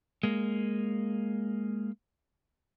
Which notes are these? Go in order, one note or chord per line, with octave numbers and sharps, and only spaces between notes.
G#3 A#3